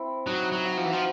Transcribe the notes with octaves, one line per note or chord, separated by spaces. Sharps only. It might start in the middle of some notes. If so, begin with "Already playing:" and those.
Already playing: C4 E4
F#3 D#4
F#3
F#4
F3
E3
F3